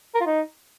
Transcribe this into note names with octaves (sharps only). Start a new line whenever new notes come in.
A#4
F4
D#4